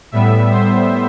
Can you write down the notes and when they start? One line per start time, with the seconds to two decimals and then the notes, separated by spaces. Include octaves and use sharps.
0.12 A2 G3 B3 E5
0.51 C5